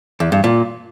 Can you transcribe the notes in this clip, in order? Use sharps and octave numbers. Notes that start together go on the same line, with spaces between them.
E2
G2
A#2